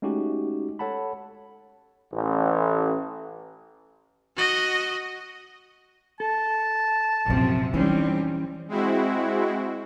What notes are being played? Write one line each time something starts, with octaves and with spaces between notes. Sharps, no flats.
G#3 A3 C#4 D#4 F#4 G4
A4 C#5 F#5 A5 B5
A1
F#4 D#5
A4 A5
A#1 F#2 C3 F3 C4
E3 G3 C4 C#4 D#4
G#3 C4 E4 F#4